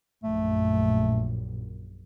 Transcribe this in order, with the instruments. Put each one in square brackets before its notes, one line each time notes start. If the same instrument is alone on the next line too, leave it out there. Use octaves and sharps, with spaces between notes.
[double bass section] A#1 F#2 A#2 [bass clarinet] A3